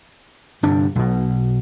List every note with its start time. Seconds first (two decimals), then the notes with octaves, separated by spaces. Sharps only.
0.63 G1 G2 C3 D4
0.95 B1 B2